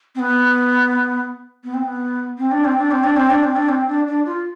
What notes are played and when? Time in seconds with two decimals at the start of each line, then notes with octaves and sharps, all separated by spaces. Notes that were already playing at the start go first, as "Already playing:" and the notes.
0.15 C4
0.19 B3
1.64 B3
1.74 C4
1.84 B3
2.38 C4
2.51 D4
2.65 C4
2.78 D4
2.91 C4
3.04 D4
3.17 C4
3.30 D4
3.43 C4
3.56 D4
3.69 C4
3.88 D4
4.07 D4
4.26 F4